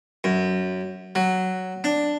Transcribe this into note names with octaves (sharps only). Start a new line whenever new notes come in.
F#2
F#3
D4